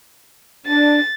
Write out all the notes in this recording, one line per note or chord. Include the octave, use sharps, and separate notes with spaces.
D4 A6